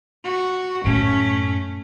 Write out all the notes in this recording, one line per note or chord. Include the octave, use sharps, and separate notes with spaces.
F#4
F#2 A2 A3 C#4